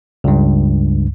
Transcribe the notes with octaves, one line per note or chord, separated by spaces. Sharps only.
C#2 G2